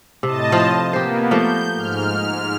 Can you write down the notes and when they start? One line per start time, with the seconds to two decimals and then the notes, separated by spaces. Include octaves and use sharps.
0.23 A2 C3 D#5 A5
0.52 F3 F4
0.93 A#3 B3 G4 C5
1.31 F3 A3 A#3 G6
1.73 G#2 F6